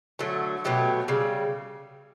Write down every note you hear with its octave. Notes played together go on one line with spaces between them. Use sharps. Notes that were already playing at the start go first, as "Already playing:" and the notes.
D3 F#3 A3
B2 F#3 A3 G4
C#3 G3